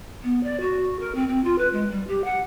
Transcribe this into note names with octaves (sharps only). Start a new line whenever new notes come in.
B3
D5
F#4
A#4
C4
C4
F4
B4
G#3
G3
G4
F#5